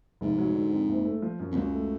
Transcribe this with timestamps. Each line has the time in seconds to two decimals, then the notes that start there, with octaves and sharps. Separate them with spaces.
0.21 F1 G#2
0.38 F#3
0.55 D3
0.72 F2
0.89 F#1
1.05 A3
1.22 F3
1.40 F#2
1.51 F2
1.55 C#2 F#2
1.72 A3